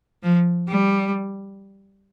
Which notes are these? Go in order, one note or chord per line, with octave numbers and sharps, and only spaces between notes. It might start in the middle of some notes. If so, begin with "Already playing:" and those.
F3
G3